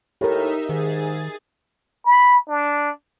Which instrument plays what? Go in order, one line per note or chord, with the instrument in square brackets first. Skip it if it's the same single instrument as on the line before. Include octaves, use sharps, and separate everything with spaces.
[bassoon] A2 [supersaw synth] D#4 E5 [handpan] G4 A#4
[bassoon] G#2 [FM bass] D#3 [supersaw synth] G#4 A6
[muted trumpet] B5
D4